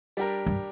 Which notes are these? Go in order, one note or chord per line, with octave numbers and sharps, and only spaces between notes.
G3 D4 G4 A#4
G2